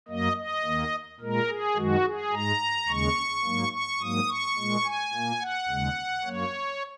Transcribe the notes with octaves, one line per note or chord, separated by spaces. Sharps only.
F#2 F#3 A#3 D#5
D#5
D#2 D#3 A#3
A#2 G#3 A#4
G#4
F#2 D#3 G#3 F#4
G#4
G#2 G#3 A#5
D#2 C#3 G#3 C#6
G#2 F#3 A#3
C#6
G#2 F#3 A#3 D#6
C#6
A#2 G#3
G#5
A#2 A#3
F#5
D#2 C#3 G#3
F#2 F#3 A#3 C#5